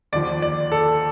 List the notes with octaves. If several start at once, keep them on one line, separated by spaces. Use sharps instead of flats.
D#2 D3 F3 D5
D5
A4